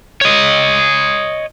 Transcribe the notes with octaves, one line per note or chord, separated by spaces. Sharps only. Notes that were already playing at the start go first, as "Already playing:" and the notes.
C#5 D#5